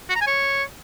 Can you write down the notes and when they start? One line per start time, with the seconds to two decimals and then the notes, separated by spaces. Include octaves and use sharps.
0.09 F#4
0.15 A#5
0.21 G#5
0.27 C#5